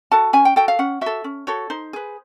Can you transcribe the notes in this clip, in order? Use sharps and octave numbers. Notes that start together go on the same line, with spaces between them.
F#4 A4 A5
C#4 G#5
G5
F#4 A4 G5
F5
C#4 F#5
F#4 A4 E5
C#4
F#4 A4 C#5
D#4 C5
G#4 B4